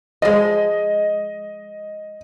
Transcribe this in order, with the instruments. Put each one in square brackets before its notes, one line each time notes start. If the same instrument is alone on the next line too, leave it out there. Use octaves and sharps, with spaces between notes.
[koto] F3 G#3 [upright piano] D#5